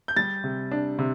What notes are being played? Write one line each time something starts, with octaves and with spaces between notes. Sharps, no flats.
G6
G3 A6
C3
D4
C3